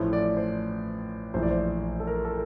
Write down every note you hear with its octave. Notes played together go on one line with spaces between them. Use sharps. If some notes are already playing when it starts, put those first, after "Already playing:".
Already playing: A1 A2 F3
D5
C5
A#1 A2 E3 C5
D5
C5
A4
A#4
A4